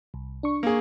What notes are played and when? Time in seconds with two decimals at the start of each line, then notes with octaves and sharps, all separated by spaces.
0.14 C2
0.43 D4 C#6
0.63 A#3 G#4